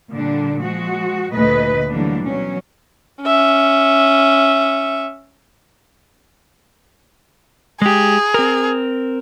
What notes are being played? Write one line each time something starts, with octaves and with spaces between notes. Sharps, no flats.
A#2 D3 G3 D4
F3 G#3 F#4
D2 A#2 A3 B4 D#5
D3 E3 F#3 G3 A#3 D4
B2 F#3 C#4
C#4 E5
G#3 G4 G#4
C4 A#4